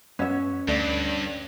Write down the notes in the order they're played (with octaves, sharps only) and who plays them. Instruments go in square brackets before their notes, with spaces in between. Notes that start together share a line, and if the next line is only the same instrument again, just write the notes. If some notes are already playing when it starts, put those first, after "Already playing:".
[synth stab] F#2 B3 [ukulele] C#4 E5
[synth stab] D2 A3 D5 [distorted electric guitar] G2